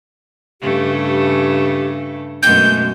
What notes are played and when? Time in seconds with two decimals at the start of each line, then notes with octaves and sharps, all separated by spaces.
0.62 G2 C#3 A3 G4
1.04 G4
2.43 F#2 B2 G#3 A3 G6